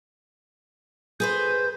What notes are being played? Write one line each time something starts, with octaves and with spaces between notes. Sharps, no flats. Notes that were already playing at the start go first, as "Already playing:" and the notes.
G#4 B4 C5 G6